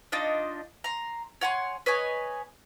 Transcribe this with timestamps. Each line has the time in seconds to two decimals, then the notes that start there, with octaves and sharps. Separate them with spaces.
0.12 D4 D#4 F4 D#5
0.84 A#5 C6
1.41 C#5 F#5 G#5 C6
1.86 B4 C#5 D#5 G#5